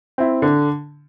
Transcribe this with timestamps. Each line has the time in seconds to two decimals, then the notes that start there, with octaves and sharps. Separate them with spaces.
0.18 C4 E4
0.42 D3